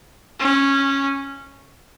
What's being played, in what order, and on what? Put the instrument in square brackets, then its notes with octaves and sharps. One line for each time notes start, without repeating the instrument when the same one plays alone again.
[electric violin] C#4